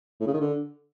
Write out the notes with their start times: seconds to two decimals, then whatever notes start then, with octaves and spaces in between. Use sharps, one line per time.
0.20 A2
0.27 C#3
0.34 D#3
0.40 D3